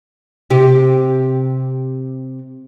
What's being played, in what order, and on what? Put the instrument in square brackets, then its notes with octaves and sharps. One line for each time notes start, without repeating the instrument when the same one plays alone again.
[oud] C3 G4